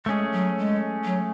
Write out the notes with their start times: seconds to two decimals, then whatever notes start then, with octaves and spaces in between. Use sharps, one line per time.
0.06 G#3 A3 C#4 G#4
0.32 F#3
0.58 G#3
1.05 F#3